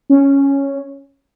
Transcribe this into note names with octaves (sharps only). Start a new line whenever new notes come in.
C#4